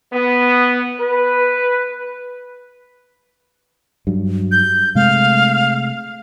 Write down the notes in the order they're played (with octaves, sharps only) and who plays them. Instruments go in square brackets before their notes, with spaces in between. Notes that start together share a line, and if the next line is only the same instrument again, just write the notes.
[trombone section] B3
B4
[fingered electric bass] G2 F#3
[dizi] G6
[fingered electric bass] C3 G#3 A3 [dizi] F5